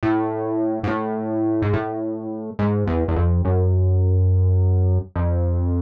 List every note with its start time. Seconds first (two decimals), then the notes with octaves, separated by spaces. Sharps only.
0.03 A2
0.83 G#2
0.88 A2
1.62 G#2
1.73 A2
2.59 G#2
2.87 E2
3.08 E2
3.16 F2
3.45 F#2
5.16 F2